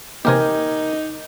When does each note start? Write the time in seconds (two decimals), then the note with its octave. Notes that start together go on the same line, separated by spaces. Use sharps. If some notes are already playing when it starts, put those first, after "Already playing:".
0.25 C3 E3 A#3 D#4 G4 A#4 G#5